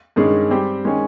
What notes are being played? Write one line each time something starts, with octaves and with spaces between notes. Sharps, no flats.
G2 D#3 G#3 C#4 G#4
G3 C4 G4
D#3 G#3 C#4